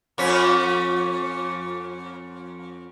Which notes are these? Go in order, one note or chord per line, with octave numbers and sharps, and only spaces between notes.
F2 C#4